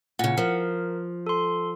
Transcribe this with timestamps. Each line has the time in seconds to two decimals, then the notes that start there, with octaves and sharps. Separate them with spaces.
0.19 A#2 C#3 F#5
0.38 F3 A#4
1.27 A4 C6